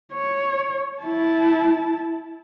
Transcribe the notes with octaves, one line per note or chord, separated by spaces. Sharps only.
C#5
E4 A5